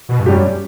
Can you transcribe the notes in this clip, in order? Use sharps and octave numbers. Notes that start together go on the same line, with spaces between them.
B2
G2
F#2 G3 C#4 G4